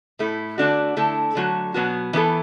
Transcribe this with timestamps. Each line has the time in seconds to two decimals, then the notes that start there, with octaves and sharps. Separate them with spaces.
0.19 A2 A3 E4
0.58 D3 A3 D4 F#4
0.97 D3 A3 E4 A4
1.35 D3 F#3 A3 F#4
1.74 B2 F#3 B3 F#4
2.13 E3 B3 E4 A4